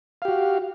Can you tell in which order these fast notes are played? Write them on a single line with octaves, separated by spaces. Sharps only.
F5 G4 F#4